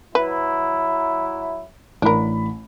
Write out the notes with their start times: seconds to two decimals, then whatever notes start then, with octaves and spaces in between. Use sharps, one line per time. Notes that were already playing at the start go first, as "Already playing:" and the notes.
0.15 F#3 E4 B4
2.02 A1 D4 A#4 B5